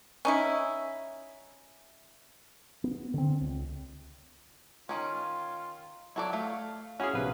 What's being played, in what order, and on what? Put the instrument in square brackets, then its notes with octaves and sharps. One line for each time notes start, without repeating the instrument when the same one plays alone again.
[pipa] C#4 D#4 E4
[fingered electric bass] B3
D3 C4
C#2
[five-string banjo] D#3 C#4 [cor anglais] F4
[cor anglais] F#3 [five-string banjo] E4 A4 D5
[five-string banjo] A3 [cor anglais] F5
[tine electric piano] C#4 E4 G#4 [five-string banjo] F#4 [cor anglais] G#5
[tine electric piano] A#1 C3 B4 [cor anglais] F5